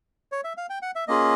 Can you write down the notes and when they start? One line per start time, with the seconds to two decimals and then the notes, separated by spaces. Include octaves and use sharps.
0.32 C#5
0.44 E5
0.57 F5
0.70 G5
0.82 F#5
0.96 E5
1.08 A#3 C#4 F4 G#4 D#5